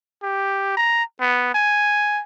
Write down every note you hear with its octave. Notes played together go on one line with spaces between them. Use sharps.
G4
A#5
B3
G#5